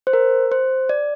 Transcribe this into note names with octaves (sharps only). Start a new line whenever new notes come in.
C5
A#4
C5
D5